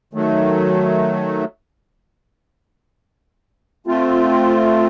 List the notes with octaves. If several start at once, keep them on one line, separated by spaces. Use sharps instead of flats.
D#3 F#3 A3
A3 C4 F4